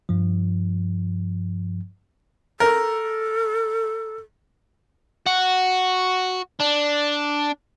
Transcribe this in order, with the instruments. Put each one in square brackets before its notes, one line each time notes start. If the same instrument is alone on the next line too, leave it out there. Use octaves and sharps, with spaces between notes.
[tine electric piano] G2 F3
[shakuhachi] A4 [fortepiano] A#4
[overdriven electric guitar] F#4
D4